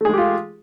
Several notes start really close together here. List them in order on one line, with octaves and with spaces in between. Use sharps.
A3 G#4 G#3 G4 F4